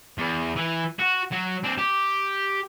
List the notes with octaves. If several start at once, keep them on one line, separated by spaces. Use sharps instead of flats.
E2
E3
F#4
F#3
C4 D4
G4